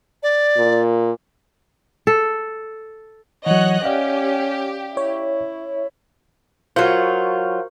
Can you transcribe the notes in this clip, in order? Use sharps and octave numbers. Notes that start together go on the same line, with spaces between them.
D5
A#2
A4
E3 F#3 C#5 D#5 F#5 F#6
C#4 G4 D5 F5
E4 C#5
F#3 F4 F#4 A#4 C5